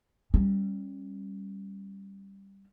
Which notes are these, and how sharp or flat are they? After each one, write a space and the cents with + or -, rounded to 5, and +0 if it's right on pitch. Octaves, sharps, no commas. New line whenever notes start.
G3 +5 C#4 -25